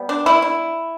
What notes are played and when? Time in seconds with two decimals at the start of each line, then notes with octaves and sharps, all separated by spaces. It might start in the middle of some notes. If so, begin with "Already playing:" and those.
Already playing: G3 B3
0.09 D4
0.26 E4
0.42 E4